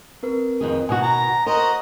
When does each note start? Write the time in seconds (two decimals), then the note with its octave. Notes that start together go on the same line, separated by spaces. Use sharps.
0.23 C4 A#4 B4
0.61 F2 D#3 G#4
0.89 B2 D#3 F#4 G#5 D#6
1.03 A#5
1.46 F#4 A#4 C5 D#5 A#5